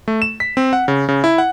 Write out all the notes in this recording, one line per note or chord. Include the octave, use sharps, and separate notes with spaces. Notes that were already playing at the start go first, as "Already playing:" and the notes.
A3
E7
B6
C4
F#5
C#3
C#3
E4
F#5